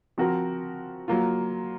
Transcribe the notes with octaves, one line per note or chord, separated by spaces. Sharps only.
F3 C4 F#4 A#4
F#3 A#3 F4